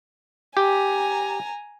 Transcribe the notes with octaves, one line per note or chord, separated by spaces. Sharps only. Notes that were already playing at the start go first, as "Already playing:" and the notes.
G4 G#5 A#5